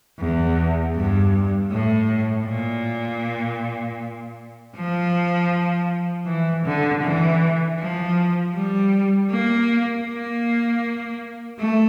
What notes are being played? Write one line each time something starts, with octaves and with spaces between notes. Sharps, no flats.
E2
G2
A2
A#2
F3
E3
D3
E3
F3
G3
A#3
A#3
A3